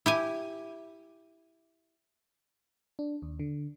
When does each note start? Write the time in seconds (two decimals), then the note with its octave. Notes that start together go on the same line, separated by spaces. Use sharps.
0.06 E4 G4 G#5
2.99 D4
3.22 D#2
3.39 D3